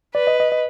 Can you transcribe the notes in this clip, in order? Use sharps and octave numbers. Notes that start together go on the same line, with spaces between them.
B4 D5
D#5
D#5
D#5